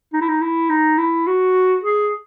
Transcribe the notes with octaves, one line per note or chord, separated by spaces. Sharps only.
D#4
E4
D#4
E4
D#4
E4
F#4
G#4